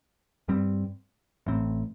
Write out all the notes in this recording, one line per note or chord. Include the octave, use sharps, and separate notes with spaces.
G2 G3 C4
A1 A2 A3 C4